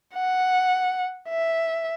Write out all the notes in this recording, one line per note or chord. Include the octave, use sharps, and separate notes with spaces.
F#5
E5